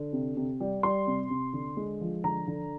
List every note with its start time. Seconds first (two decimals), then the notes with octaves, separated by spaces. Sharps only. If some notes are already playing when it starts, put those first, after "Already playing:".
Already playing: D3
0.13 C3
0.37 C3
0.60 G3
0.83 G3 C6
1.07 C3
1.30 C3
1.53 D3
1.77 G#3
2.01 F3
2.24 D3 A#5
2.48 D3